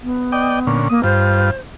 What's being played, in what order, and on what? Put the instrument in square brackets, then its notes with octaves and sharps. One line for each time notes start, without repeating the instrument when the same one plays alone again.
[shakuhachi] B3
[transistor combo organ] D5 D#5 G5
A#2 D3 C#4
[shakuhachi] A#3 [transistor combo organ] D#6
[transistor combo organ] G2 F4 [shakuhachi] C5